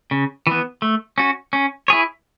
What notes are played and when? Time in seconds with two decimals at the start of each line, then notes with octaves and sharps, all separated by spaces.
0.11 C#3
0.47 E3 B3
0.82 A3
1.18 C#4 F#4
1.53 C#4
1.88 E4 G#4 C#5